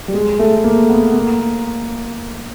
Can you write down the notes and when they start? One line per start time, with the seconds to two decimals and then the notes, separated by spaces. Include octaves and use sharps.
0.08 G3
0.14 G#3
0.39 A3
0.64 A#3
0.90 B3
1.14 A#3